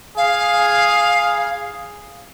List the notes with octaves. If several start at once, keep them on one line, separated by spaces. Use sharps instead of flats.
G#4 F5